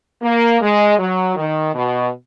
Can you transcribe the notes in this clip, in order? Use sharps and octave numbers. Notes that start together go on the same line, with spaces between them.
A#3
G#3
F#3
D#3
B2